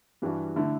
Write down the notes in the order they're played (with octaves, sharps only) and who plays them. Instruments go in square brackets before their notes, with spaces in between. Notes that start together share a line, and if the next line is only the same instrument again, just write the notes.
[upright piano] G2 E3 G3 D4 F#4
D3 A3 E4